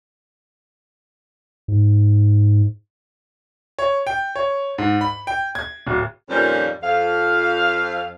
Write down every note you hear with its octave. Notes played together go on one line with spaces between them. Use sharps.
G#2
C#5
G5
C#5
G#2
B5
G5
G#6
D1
F2 A#2 D#3 F3 G3 C#4
F2 F5